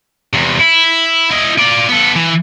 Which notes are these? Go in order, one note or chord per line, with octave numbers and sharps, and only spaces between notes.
E2 C3
E4
E4 D#5
F4 D5
B3 A4
E3